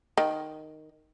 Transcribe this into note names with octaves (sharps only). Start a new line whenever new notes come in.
D#3